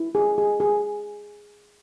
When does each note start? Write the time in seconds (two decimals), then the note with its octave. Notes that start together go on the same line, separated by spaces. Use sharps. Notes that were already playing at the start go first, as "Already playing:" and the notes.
Already playing: E4
0.15 G#4
0.38 G#4
0.60 G#4